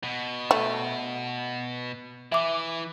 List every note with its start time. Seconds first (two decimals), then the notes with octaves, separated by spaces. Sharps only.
0.03 B2
0.51 A3
2.32 E3 E5 D6